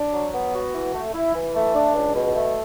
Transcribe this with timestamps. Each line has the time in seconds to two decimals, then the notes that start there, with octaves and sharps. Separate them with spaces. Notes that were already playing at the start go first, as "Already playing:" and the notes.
Already playing: D4
0.13 F#3
0.34 B3
0.53 F#4
0.74 E3
0.94 A3
1.14 E4
1.34 E3
1.54 A3
1.75 D4
1.94 C#2
2.15 B2
2.35 A3